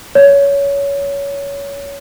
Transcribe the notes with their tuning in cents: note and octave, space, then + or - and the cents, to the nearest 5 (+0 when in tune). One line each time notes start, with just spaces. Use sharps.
C#5 +20